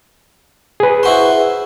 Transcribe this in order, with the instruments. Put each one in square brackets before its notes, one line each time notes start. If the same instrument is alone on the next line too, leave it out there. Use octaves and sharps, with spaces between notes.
[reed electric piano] G#4 B4
[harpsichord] E4 F#4 C5